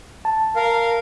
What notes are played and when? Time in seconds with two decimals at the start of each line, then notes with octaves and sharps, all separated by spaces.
0.25 A5
0.56 A#4 F5